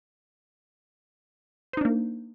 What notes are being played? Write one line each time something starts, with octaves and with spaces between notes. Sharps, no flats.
A#3 D4 D#4 C5